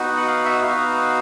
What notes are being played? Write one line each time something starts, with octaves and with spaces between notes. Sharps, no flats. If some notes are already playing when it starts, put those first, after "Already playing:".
Already playing: B3 D#4 F#4
F#5
F5
E5
B3 D#4 F#4 F5